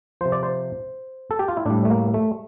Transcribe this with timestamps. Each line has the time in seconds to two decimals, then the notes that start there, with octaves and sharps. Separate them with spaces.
0.21 C3 F3 C5
0.32 D5
0.43 C5
1.31 A4
1.39 G4
1.48 F4
1.57 E4
1.65 A2 G3 D4
1.85 A3
1.90 A#3
2.14 A3